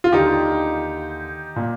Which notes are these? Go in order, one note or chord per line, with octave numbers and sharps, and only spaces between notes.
F4
D#2 D3 D#4 G4
A#2